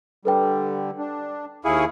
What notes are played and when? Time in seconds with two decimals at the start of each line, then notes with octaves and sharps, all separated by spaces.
0.25 D3 G3 A4 B4 G5
0.98 D4
1.65 D#2 E4 G#4 F5 C#6 D#6